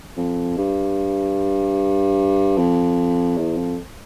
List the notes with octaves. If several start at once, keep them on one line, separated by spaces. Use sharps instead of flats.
F2
G2
F2
E2
F2